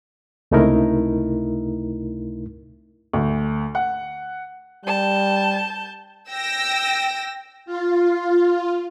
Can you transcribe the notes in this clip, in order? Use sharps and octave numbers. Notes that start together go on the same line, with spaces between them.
C#2 C3 A3 D#4 E4 A#4
D2
F#5
G3 A5 G6
G5 E6 A#6
F4